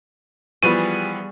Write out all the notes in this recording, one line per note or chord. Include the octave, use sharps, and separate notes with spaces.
E3 F3 G3 B3 F#4 G#4 D#7